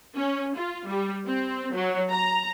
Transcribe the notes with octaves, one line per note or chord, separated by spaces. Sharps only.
C#4
F4
G3
C4
F#3
A#5